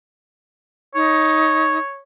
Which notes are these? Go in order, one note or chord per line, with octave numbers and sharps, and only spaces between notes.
D#4 C#5